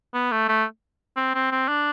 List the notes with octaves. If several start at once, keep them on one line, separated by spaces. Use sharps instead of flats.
B3
A3
A3
C4
C4
C4
D4